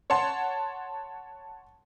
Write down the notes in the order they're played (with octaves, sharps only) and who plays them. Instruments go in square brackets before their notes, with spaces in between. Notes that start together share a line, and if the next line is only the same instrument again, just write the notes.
[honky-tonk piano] C#5 F#5 A5 C6